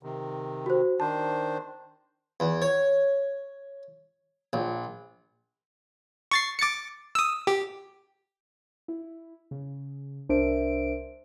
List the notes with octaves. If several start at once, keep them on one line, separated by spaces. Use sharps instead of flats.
C3 D#3
F#4 C5
D#3 D4 C5 A5
E2
C#5
A#1
C#6 A6 C7
D6 A6 C#7
D#6 E6
G4
E4
C#3
C2 D4 A#4 C5 E5 D7